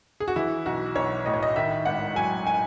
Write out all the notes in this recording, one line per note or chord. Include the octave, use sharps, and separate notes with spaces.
G#4
F#4
E3 E4
B1 F#4
B1 C#5
A2 D#5
C#5
D#5
D#3 E5
G#1 F#5
F#3 G#5
G#5